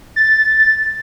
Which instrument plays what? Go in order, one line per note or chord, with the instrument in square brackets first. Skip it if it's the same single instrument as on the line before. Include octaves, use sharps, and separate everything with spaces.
[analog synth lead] A6